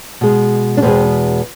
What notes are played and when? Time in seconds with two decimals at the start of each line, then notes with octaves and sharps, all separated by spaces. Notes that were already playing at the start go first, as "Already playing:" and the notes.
0.21 B2 G#3
0.77 D4
0.82 E2 B2 G#3 C4